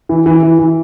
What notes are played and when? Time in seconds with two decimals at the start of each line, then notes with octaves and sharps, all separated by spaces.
0.09 E3
0.26 E3
0.43 E3
0.59 E3